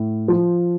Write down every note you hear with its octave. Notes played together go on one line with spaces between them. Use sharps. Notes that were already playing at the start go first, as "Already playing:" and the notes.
Already playing: A2
F3